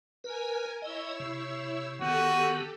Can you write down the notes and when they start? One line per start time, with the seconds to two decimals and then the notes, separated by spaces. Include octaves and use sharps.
0.24 A#4 B4 G#5
0.82 E4 C#5 D#5 E6
1.20 C3
2.01 D#3 B3 F#4 G4 A4